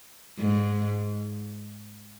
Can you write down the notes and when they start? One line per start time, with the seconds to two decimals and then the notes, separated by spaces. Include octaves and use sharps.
0.39 G#2